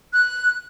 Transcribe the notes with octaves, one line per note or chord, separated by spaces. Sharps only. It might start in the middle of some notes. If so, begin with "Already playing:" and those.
F#6